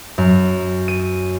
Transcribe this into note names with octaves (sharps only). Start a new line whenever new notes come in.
F#2
D#7